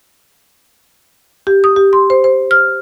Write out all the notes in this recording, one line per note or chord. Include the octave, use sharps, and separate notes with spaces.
G4
D#6
G4
C6
C5
C5
F6